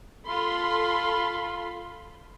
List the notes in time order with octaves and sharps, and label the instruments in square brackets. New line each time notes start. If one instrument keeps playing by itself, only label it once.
[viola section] F4 A4 B5 C6